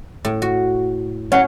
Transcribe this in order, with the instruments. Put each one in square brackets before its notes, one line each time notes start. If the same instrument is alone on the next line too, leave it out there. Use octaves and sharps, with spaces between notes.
[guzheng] A2
F#4
[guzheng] C#4 [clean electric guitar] C#5 F#5